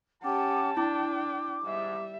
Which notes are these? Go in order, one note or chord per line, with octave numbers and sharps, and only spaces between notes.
C#4 G4 F#5 G5 A5 D6
D4 E4 G5 D6
G#2 G3 E5